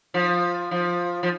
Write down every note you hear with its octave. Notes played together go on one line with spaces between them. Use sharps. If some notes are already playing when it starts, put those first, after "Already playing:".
F3
F3
F3